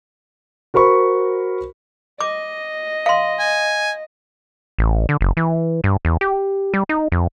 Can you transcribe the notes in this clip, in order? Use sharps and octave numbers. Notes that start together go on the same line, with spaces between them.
F#4 A#4 C5 B5 C#6
D#5 D6
F5 C6
G#5
A1
D3
F#1
E3
G2
E2
G4
G3
D#4
F2